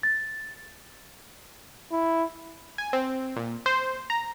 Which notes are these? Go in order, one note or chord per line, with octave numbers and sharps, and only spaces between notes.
A6
E4
G#5
C4
A#2
C5
A#5